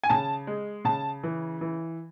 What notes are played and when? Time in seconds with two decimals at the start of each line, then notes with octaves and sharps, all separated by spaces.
0.04 G#5
0.09 C#3 A5
0.47 G#3
0.85 C#3 A5
1.23 E3
1.61 E3